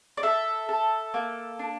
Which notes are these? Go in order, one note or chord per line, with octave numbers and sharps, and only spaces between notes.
D5
A4 E5
A4
A#3
D4